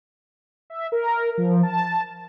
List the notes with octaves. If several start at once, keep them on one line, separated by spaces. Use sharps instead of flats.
E5
A#4
F3
A5